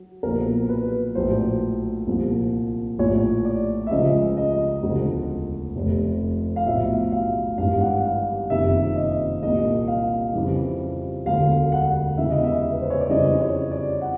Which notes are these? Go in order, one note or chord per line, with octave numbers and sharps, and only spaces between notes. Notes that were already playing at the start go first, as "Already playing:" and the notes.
Already playing: F#3
B1 A#2 F3 A#4
B4
A#1 A2 F#3 C5
C2 A#2 F3
A#1 A2 F3 C#5
D5
E5
C#2 C#3 F3 D#5
D#5
E1 D2 C#3 F3
F1 F2 C3
F5
B1 A2 F3 E5
F5
G#1 G2 E3 G3 F5
F#5
F5
F#1 F2 C3 D#3 E5
D#5
C2 A#2 G3 D#5
F5
F2 C#3 E3 G3
E1 D2 D3 F#3 F5
F#5
E1 E2 C#3 E3 E5
D#5
E5
B4
C5
C#5
D5
F2 C#3 E3 G3 D#5
C#5
D5
F#5